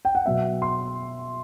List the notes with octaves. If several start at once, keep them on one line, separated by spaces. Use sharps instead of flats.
G5
F#5
B2 F#3 B3 E5
C6